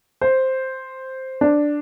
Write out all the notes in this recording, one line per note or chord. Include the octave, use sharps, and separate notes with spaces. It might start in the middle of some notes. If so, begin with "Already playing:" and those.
C5
D4